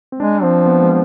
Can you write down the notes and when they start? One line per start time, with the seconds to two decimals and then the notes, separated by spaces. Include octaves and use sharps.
0.12 C4
0.20 G#3 D4
0.43 F3 C4
0.66 B3
0.82 G#3